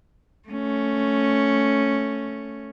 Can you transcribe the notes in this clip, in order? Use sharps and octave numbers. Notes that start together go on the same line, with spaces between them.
A3 C#4